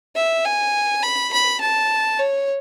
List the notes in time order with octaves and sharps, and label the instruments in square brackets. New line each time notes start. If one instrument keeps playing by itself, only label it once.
[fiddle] E5
G#5
B5
B5
A5
C#5